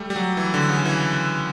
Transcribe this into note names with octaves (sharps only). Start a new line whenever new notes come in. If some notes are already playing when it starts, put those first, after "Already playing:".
Already playing: G3 A3
G3
F#3
E3
D3
C#3
E3